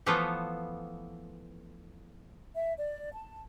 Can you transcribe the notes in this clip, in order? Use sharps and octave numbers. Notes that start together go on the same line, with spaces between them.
E3 F3 A3 B3 F4 A4
E5
D5
A5